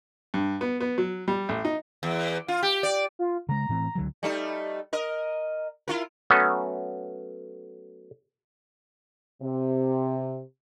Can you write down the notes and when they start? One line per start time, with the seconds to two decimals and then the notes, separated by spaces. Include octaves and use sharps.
0.34 G2
0.61 B3
0.81 B3
0.98 F#3
1.28 G3
1.49 A1
1.65 D#4
2.03 E2
2.48 F4
2.63 G4
2.83 D5
3.19 F4
3.49 C#3 G#3 A#5
3.69 A2 E3 C4
3.95 C#2 D3 F#3
4.23 G3 A3 D#4
4.93 A#4 D#5
5.88 E4 F4 A#4
6.30 F#3 A3 B3 C#4 A4
9.41 C3